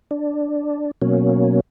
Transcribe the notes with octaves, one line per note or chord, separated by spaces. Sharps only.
D4
B2 F#3 A#3 C#4